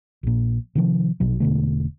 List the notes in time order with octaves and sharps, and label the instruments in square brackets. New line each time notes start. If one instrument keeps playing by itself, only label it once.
[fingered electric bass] A#1 A#2
C3 D#3 F3
A#1 B2 F#3
E1 B2 D3 A3